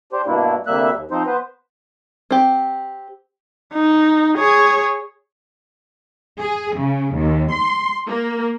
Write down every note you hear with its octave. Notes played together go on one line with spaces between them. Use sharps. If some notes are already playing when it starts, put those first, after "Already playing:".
D4 G4 C5
G2 B2 A#3 D4 E4
D2 C3 G3 A#3 E5 F#6
D#2
F3 C4 D#4 C5
B3 B4 C5
C4 G4
D#4
G#4 C#5
G#4
C#3
D#2
C6
A#3